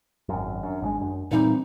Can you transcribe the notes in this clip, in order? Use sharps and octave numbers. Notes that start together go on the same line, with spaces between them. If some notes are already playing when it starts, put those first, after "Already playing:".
G#1 F#2
F#2 D4
G#1 D3 G#3
F#2
A#2 E3 G3 C4 D#4